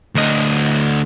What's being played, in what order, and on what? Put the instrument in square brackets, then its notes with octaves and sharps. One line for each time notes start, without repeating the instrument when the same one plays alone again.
[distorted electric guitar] D2 D#5